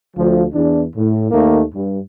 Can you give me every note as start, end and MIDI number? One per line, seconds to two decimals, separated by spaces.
0.17 0.45 38
0.17 0.45 53
0.54 0.84 40
0.54 0.84 62
0.96 1.29 45
1.31 1.63 39
1.31 1.63 51
1.31 1.63 57
1.31 1.63 58
1.74 2.00 43